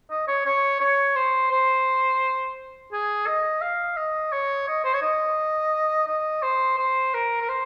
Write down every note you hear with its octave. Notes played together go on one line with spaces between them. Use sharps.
D#5
C#5
C#5
C#5
C5
C5
G#4
D#5
F5
D#5
C#5
D#5
C5
C#5
D#5
D#5
C5
C5
A#4
A#4
C5